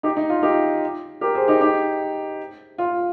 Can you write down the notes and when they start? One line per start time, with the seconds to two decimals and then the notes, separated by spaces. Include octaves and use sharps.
0.03 D#4 G4
0.17 D#4
0.30 F4
0.43 D#4 G4
1.21 G4 A#4
1.35 G#4 C5
1.48 D#4 G4
1.61 D#4 G4
2.78 F4